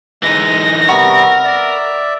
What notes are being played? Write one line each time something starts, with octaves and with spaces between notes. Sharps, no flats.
E3 G#3 D#4 A#6
C3 G3 B3 A#4 F#5 C#6 E6
D5 E5